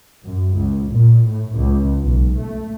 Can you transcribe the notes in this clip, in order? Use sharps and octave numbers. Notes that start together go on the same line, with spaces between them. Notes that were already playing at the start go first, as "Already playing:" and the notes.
F#2
C#2
A#2
A2
C#2
B1
A3